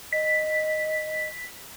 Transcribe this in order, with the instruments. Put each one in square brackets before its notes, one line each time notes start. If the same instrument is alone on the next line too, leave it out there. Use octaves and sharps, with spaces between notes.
[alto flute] D#5 [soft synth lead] B6